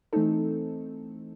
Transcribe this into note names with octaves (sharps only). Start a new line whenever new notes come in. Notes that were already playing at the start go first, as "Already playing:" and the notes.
E3 A3 C4 D#4 A4